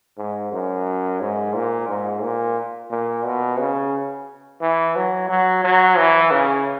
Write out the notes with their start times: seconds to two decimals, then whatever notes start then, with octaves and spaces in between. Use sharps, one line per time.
0.17 G#2
0.52 F#2
1.21 G#2
1.54 A#2
1.88 G#2
2.22 A#2
2.90 A#2
3.25 B2
3.59 C#3
4.61 E3
4.96 F#3
5.29 F#3
5.64 F#3
5.98 E3
6.31 C#3